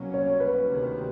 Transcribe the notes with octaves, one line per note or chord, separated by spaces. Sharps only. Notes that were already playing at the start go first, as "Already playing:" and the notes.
Already playing: C2 B2 F#3 A#3 C#4
C#5
B4
D2 C3 D#3